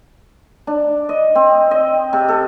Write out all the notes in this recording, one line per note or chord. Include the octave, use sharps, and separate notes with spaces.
D4
D#5
C4
D#5
C3
A4